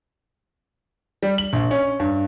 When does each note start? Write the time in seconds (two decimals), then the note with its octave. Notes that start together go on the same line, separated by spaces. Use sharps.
1.23 G3
1.38 F#7
1.53 A#1
1.71 C#4
2.00 G2